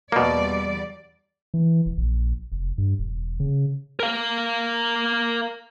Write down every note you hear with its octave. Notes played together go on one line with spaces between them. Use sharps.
E2 B2 G3 A#3 D5
E3
E1
A#1
F1
G2
E1
C#3
A#4 F5